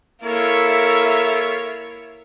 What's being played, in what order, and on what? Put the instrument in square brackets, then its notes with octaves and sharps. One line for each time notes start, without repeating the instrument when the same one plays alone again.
[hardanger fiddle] A#3 E4 [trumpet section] F4 C#5 [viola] A4 A#4 [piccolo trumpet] E5